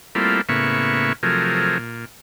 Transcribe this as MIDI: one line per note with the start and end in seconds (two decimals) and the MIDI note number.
0.15 0.41 55
0.15 0.41 57
0.15 0.41 58
0.15 0.41 60
0.15 0.41 64
0.15 0.41 65
0.49 1.13 45
0.49 1.13 49
0.49 1.13 58
0.49 1.13 59
0.49 1.13 76
0.49 1.13 85
1.23 1.78 48
1.23 1.78 53
1.23 1.78 54
1.23 1.78 57
1.23 1.78 68
1.23 1.78 70
1.78 2.05 46